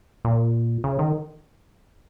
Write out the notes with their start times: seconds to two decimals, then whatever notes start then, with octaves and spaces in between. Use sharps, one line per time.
0.25 A#2
0.84 C#3
0.99 D#3